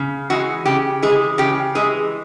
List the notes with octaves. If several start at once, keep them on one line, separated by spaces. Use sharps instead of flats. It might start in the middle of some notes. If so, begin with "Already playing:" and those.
Already playing: C#3
E3 G#3 F#4
C#3 G4
E3 G#3 G#4
C#3 G4
E3 G#3 G#4